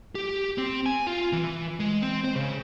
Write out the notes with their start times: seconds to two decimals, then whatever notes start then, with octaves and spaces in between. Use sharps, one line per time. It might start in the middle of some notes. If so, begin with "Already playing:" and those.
0.15 G4
0.58 C4
0.86 G#5
1.07 F4
1.33 E3
1.80 G#3
2.02 C4
2.25 C5
2.36 C#3